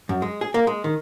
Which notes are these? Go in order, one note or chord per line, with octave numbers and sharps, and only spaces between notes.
F#2
G#3
G#4
A#3
G#3
D#3